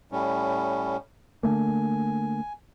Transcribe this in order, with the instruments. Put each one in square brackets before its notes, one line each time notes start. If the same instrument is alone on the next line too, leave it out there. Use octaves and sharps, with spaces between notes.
[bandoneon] A2 G3 C#4
[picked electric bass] D3 A3 A#3 [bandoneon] G#5